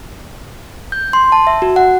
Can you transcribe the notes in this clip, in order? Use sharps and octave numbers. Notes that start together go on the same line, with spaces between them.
G6
C6
A5
E5
F#4
F#5